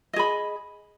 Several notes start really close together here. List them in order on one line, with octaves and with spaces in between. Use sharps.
D#5 G#4 B5